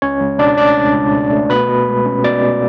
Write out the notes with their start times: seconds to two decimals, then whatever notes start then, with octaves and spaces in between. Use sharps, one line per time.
0.02 C#2 C#4 C#5
0.20 C#2
0.39 B2 D4 D5
0.57 A3 D4 D5
0.76 C#2
0.95 C#2
1.13 B2
1.31 A3
1.50 B2 B4 B5
1.68 B2
1.87 G#3
2.06 C#4
2.24 B2 D5 D6
2.43 B2